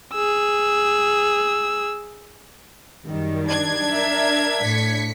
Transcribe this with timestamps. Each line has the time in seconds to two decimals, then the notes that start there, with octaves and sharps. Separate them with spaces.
0.14 G#4 E6
3.05 F#2 D#3 G3
3.45 D4 G#6
3.89 A#4 E5
4.61 A2 B6 C#7